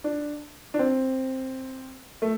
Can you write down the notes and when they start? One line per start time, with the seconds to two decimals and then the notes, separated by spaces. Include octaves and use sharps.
0.04 D4
0.74 D4
0.79 C4
2.22 A3